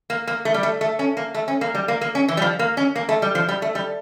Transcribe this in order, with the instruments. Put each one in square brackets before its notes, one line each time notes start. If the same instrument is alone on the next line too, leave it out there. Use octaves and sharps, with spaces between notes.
[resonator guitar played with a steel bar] A#3
A#3
A3
G3
A3
A3
C#4
A#3
A3
C#4
A#3
G3
A#3
A#3
C#4
E3
G3
F3
A#3
C#4
A#3
A3
G3
F3
G3
A3
G3